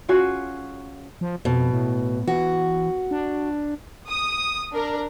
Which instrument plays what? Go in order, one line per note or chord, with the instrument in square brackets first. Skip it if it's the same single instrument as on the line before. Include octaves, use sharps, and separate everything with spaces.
[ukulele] C#4 F4 F#4 G#4
[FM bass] F3
[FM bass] F2 [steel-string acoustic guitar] B2
[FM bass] A2
[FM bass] E3 [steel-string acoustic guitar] F#4
[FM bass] D4
[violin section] D#6
D4 A#4